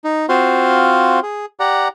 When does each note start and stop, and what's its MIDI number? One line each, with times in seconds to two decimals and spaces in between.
0.04 0.26 63
0.29 1.20 60
0.29 1.20 65
0.29 1.20 66
0.29 1.20 72
0.29 1.20 77
0.29 1.20 84
1.23 1.46 68
1.60 1.88 67
1.60 1.88 74
1.60 1.88 78
1.60 1.88 82